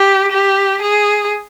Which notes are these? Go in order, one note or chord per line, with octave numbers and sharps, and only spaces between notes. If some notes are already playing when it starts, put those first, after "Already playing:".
Already playing: G4
G4
G#4